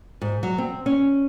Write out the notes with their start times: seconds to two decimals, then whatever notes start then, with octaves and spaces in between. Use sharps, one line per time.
0.21 G#2
0.43 F#3
0.58 C4
0.86 C#4